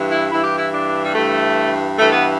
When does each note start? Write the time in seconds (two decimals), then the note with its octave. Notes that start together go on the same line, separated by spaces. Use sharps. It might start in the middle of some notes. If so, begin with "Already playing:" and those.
Already playing: G2 E3
0.11 E4
0.32 G2 E3 E4
0.44 G4
0.57 E4
0.74 D4
1.04 G3
1.15 G2 E3 A3
1.98 G2 E3 A3
2.12 B3